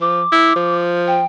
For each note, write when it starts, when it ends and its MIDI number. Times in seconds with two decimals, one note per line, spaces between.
0.01 0.23 53
0.01 0.79 86
0.32 0.55 64
0.56 1.21 53
1.07 1.25 79